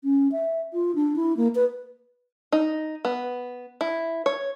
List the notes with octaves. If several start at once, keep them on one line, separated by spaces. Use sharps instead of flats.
C#4
E5
F4
D4
E4
A#3
B4
D#4
B3
E4
C#5